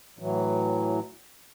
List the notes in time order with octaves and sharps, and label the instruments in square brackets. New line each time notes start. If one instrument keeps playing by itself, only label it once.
[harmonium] A2 E3 F#3